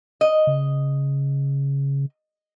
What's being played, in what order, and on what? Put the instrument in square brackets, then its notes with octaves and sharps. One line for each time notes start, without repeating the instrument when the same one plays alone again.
[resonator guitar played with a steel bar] D#5
[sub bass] C#3